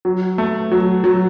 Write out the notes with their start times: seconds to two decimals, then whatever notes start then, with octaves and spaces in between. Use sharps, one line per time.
0.05 F#3
0.38 A3
0.72 F#3
1.04 F#3